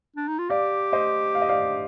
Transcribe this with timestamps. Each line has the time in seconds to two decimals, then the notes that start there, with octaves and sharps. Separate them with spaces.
0.17 D4
0.28 D#4
0.39 F4
0.50 G4 D5 F5
0.92 C5 D#5
1.35 F5
1.42 D#5
1.49 D5 F5